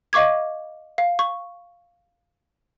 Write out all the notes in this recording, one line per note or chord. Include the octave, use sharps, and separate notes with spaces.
D#5 F5 C#6 D6 G#6
F5
C#6